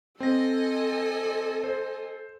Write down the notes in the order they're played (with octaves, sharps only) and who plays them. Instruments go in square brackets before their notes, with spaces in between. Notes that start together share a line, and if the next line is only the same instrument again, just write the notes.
[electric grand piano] C4 A#6 [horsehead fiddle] A4 [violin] D#5 G#5
[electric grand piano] C5